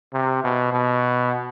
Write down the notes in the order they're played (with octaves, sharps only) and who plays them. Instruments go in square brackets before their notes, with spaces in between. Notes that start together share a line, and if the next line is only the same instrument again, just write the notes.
[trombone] C3
B2
B2